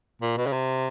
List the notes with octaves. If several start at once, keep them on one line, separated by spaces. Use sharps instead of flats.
A#2
B2
C#3
C3